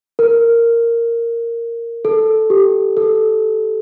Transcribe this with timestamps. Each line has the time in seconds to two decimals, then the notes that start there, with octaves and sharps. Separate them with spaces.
0.19 A#4
2.05 A4
2.50 G4
2.97 A4